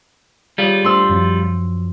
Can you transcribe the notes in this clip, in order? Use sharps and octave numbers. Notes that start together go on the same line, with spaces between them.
G3 F4 G#4 C#5
A3 D4 C5 C6 E6
F#2 F3 F#3